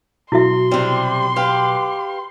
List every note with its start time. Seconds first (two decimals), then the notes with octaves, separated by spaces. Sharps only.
0.32 B2 F#3 E4 F#4 E5 C6
0.71 C3 G3
1.36 G4 B4 F5